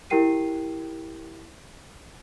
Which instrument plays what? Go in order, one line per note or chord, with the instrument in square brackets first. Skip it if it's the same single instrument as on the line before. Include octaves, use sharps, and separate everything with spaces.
[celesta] E4 G4 A#4 G5 C7 D#7